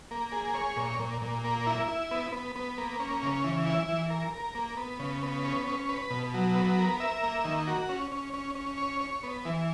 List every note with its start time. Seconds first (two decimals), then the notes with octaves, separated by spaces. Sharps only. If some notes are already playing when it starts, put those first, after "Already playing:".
0.11 A#3
0.32 G#4
0.54 C#5
0.77 A#2
0.99 A#2
1.22 A#2
1.44 A#3
1.66 E4
1.88 E4
2.11 B3
2.32 B3
2.56 B3
2.78 A#3
3.00 C#4
3.22 C#3
3.44 E3
3.66 E4
3.88 E3
4.10 A#4
4.34 A#4
4.55 A#3
4.77 B3
4.99 C#3
5.23 B3
5.45 C#4
5.67 C#4
5.89 B4
6.10 B2
6.34 F#3
6.55 B3
6.78 A#4
7.00 E5
7.23 A#3
7.44 D#3
7.67 F#4
7.89 C#4
8.12 C#4
8.34 C#4
8.55 C#4
8.77 C#5
9.01 C#5
9.23 B3
9.45 E3